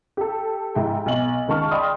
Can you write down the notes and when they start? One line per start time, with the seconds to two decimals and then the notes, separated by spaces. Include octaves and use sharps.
0.17 G4 A4
0.75 G#2 E4 G4 G5
1.06 B1 F#7
1.48 C#2 D#3 A5 C#6 F6
1.71 D5 D#5 G5 B5 C6 D#6